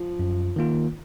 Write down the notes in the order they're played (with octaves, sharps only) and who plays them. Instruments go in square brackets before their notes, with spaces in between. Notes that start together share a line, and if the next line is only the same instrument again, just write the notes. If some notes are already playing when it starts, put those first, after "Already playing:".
Already playing: [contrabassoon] F3
[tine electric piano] F#2
D#3 A#3 F4